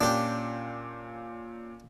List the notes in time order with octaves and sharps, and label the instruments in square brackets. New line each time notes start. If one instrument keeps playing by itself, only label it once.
[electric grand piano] A#2 C#4 F4 [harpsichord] D4 G4